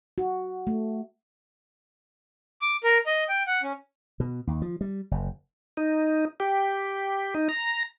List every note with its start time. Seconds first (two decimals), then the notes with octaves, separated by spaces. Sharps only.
0.18 F#4
0.67 A3
2.62 D6
2.84 A#4
3.06 D#5
3.29 G5
3.47 F#5
3.63 C#4
4.20 B2
4.47 D#2
4.62 F3
4.81 G3
5.11 F#1
5.77 D#4
6.40 G4
7.35 D#4
7.49 A#5